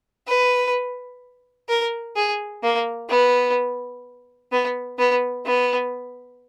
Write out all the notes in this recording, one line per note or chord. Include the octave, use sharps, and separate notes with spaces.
B4
A#4
G#4
A#3
B3
B3
B3
B3